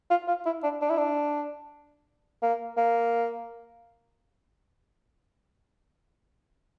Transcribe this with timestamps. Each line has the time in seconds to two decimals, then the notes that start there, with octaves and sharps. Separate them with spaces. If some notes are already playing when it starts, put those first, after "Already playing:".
0.10 F4
0.28 F4
0.46 E4
0.63 D4
0.82 D4
0.90 E4
0.98 D4
2.42 A#3
2.77 A#3